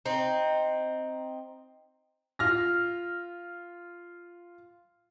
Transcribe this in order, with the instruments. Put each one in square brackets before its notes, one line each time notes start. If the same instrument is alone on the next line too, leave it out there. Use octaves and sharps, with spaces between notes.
[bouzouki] C4 D#4
[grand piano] F4 F6 A#6